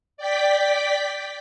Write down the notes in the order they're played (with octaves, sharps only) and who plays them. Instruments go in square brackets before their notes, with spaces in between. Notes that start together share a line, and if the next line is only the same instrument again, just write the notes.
[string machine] D5 G5 B6